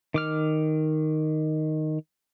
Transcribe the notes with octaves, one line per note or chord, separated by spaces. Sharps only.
D#3 D6 F6